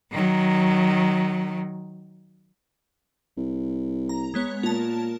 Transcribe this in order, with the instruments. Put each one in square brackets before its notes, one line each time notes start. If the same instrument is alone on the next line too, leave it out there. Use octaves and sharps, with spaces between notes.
[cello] D#3 F#3
[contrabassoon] C2
[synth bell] A#5
G#3 B3 C#5
[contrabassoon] A#2 [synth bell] A#4 A5